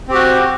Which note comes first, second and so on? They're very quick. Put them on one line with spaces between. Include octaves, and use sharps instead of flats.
C4 G4 F#4